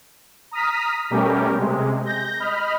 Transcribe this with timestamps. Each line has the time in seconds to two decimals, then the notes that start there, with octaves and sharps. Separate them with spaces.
0.51 A#5 D#6 F6 B6
1.10 B2 G3 A3 C#4 G4 A#4
1.57 C3 G#3
2.05 G6 A#6
2.40 D#5 B5 F6